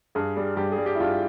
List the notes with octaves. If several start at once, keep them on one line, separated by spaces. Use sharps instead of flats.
G2 G#4
G3
G2 G4
G#4
G3
G4
E4
G2 F4